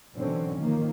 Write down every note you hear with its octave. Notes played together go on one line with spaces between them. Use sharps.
B2 D3 E3 F#3 C4 C#4
D#3 F3 A#3